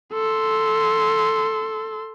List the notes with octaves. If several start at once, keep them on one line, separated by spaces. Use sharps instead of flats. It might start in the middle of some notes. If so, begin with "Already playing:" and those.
A4 C6